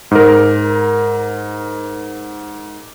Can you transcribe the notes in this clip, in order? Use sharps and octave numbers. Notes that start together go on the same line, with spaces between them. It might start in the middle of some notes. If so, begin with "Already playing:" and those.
G#2 A#4